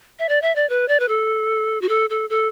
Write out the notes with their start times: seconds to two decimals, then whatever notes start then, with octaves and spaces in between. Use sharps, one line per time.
0.19 E5
0.29 D5
0.42 E5
0.56 D5
0.69 B4
0.88 D5
1.00 B4
1.08 A4
1.81 F#4
1.89 A4
2.10 A4
2.30 A4